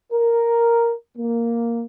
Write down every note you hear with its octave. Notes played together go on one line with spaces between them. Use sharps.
A#4
A#3